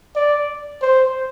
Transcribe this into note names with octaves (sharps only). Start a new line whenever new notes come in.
D5
C5